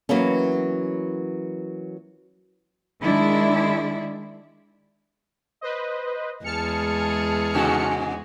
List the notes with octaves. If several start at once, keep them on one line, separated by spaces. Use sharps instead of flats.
E3 F#3 A#3 B3 C#4
D#3 G#3 D4 E4
B4 C5 D#5
E2 G#3 G#4 A5 F6 C#7
G#2 C3 F#4